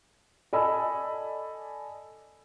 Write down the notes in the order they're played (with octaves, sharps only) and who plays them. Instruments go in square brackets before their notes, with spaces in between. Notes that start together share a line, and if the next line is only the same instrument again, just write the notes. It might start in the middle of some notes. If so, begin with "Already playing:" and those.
[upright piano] A4 D5 D#5 G#5 B5 E6